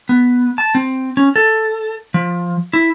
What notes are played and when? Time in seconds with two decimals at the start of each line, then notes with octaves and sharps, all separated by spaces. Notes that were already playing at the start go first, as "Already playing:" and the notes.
0.09 B3
0.58 A5
0.75 C4
1.17 C#4
1.36 A4
2.14 F3
2.73 E4